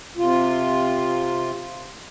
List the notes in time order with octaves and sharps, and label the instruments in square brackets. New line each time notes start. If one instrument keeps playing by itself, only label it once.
[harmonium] C3 F4